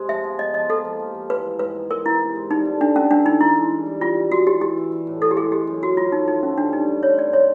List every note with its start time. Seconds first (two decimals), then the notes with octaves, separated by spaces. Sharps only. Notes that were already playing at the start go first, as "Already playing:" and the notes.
Already playing: C3 G#3 C4
0.09 F3 E5
0.24 B3
0.39 B3 D#5
0.54 F3 D#5
0.69 A#3 A4
0.85 F3
1.00 G4
1.15 F3
1.30 E3 B4
1.45 G#3
1.59 G#2 B4
1.75 B3
1.90 G#3 A#4
2.05 G#3 E4
2.20 C3
2.36 G#3
2.50 G3 D#4
2.65 D3
2.81 D3 D4
2.95 D3 C#4
3.11 E3 D4
3.26 E3 D#4
3.41 E3 E4
3.56 G#3
3.71 G3
3.86 G3
4.01 G3 F4
4.16 D#3
4.31 E3 F#4
4.47 E3 G4
4.61 E3 G4
4.77 E3
4.92 E3
5.07 A2
5.22 E3 A4
5.31 G4
5.37 G#3 G#4
5.52 G#3 G4
5.67 F#2
5.82 F#2 F#4
5.97 F#2 F4
6.12 A3 D#4
6.27 F3 D#4
6.43 A3 C#4
6.57 G2 D4
6.73 G3 D#4
6.88 G3
7.03 C4 C#5
7.18 C4 D5
7.33 C#3 C#5